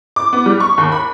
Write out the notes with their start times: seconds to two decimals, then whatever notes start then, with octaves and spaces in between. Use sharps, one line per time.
0.16 D6
0.33 B3
0.46 G3
0.60 C#6
0.78 D#2
0.92 B5